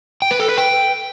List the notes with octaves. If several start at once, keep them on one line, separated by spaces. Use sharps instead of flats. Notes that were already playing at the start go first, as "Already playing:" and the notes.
G5
B4
A4
B4
G5